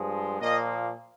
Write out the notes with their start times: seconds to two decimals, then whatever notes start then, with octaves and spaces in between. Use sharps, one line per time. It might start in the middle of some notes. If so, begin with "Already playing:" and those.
Already playing: G2 F3 G#3
0.40 A#2 F3 A#3 D#5